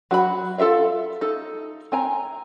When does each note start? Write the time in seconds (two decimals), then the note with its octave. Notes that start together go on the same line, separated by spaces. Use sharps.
0.11 F#3 F#4 G#4 B5
0.58 F4 A4 A#4 E5 F5
1.21 D#4 A4
1.92 C4 G#5 A#5